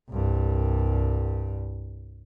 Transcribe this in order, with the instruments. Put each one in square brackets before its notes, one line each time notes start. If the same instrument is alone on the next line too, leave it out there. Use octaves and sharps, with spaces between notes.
[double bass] C2 G2